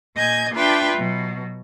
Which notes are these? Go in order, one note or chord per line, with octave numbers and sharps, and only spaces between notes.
A#2 D#5 G#5 G6 G#6
D4 F4 B4 E5 G5
B2 F#3